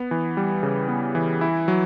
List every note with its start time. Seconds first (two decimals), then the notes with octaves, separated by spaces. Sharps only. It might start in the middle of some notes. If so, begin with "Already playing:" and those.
Already playing: B3
0.11 E3
0.37 G3
0.63 C#3
0.89 B3
1.15 E3
1.41 E4
1.68 F#3